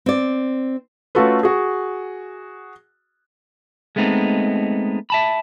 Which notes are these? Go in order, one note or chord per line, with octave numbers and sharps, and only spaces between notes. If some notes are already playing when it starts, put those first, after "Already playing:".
C4 D5
A3 C#4 F4 F#4 A4 B4
F#4 G#4
G#3 A3 B3 C4 D#4
E5 A5 B5